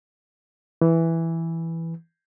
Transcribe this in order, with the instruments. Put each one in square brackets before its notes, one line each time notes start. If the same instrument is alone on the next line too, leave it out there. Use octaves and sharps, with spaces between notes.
[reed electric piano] E3